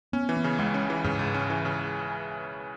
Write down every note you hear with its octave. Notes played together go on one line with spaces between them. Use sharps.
B3 C#4
E3
B3
C#3
C#2 G#3
C#4
E3
G#2 C#3
C#2
C#4
E3
C#3